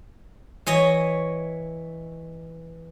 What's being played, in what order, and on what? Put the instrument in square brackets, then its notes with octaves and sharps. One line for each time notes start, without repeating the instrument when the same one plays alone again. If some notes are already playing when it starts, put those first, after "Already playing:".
[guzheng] E3 C#5 D#5